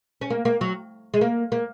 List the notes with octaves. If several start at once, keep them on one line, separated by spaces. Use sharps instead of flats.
C#4
A#3
A#3
F#3
G#3
A#3
A#3